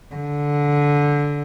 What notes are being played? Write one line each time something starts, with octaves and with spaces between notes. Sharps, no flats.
D3